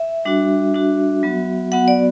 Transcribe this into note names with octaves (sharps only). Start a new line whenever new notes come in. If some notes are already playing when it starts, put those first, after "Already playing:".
Already playing: E5
G3 D4 F#4
G3 D4 F#4
F#3 B3 F#4
F#3 B3 F#4 F#5
D5